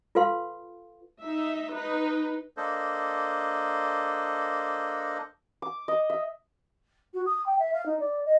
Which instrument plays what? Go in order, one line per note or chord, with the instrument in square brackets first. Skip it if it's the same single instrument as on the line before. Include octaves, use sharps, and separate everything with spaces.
[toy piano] F4 A4 B4 F5 C6
[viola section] D#4 E5
D#4 B4
[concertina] A#3 D4 A4 C5 D#5
[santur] D6
D#5
E5
[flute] F#4
D#6
G5
E5
F5
D#4
D5
D#5